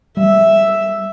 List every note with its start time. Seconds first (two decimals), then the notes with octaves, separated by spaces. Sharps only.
0.17 G3 E5